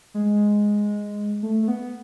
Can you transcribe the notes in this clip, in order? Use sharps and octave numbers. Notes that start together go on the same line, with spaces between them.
G#3
A3
A3
B3